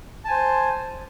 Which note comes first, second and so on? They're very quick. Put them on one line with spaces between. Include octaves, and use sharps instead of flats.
A5 G#5 C5